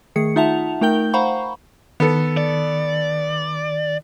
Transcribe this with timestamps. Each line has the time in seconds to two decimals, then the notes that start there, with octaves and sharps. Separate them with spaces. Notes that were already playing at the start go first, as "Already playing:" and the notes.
0.16 D#3 A3 G#4 C#7
0.36 D#4 F4 E5 F#5 A5 F7
0.81 A3 D#4 A#4 G5 G6 G7
1.13 C5 F5 F#5 A#5 B5 C#6
2.00 D#3 B3 A4
2.37 D5